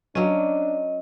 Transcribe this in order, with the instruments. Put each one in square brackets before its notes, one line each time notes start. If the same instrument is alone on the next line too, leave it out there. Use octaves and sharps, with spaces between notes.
[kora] F#3 C#4 [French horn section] D4 [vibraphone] D#5